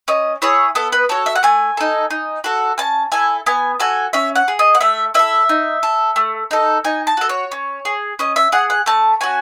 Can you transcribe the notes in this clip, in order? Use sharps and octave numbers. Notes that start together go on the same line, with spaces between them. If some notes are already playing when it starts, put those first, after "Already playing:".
C#4 D#5
E4 G#4 C#5
B3 A4
B4
F#4 A4 C#5
E5
F#5
A3 G#5
D#4 A4
D#4
F#4 A4
C#4 A5
E4 A4 G#5
B3 G#5
F#4 A4 G#5
C#4 E5
F#5
G#4
D#5
F#5
A3 E5
E4 A4 E5
D#4
A4
A3
D#4 A4
D#4 G#5
A5
F#4 A4
C#5
C#4
G#4
C#4 D#5
E5
G#4 F#5
F#5
A3 A5
C#4 F#4 G#5